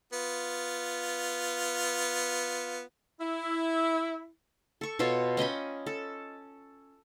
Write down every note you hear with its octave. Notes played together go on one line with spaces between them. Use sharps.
B3 F4
E4
A4 C#6
B2 F4 A4 C#5
C#4 D#5 G5 B5
A4